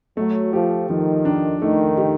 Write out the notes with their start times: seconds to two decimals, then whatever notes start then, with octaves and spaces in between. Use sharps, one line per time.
0.17 F#3 A3
0.53 F3 G4
0.89 D#3 F3
1.25 D4
1.61 D#3 A3
1.98 G4